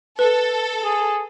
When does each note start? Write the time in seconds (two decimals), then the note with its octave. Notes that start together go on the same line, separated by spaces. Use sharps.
0.19 A4 B4
0.84 G#4